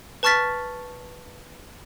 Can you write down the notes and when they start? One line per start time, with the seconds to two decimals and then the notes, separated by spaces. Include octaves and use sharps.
0.23 B4 A5 C#6 F6 A6 B6